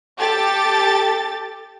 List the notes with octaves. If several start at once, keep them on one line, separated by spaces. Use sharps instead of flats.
G4 A4 A6